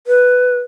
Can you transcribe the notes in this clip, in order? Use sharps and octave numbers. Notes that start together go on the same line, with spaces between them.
B4